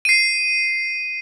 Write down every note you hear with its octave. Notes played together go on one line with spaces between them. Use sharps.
C7 D#7